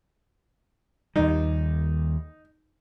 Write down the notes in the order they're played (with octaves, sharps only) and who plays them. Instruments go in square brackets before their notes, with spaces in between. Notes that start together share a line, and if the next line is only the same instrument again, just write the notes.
[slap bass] D#2 G3 [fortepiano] D#4